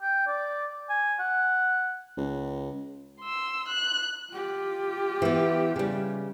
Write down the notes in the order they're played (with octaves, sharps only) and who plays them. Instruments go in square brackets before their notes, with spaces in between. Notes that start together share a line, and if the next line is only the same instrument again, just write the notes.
[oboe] G5
D5
G#5
F#5
[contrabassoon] C#2
[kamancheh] C6 E6
F#6
[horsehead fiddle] F4 G4
[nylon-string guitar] E3 B3
C#3 G3